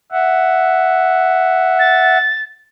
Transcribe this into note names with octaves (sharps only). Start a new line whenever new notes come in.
E5 F#5
A6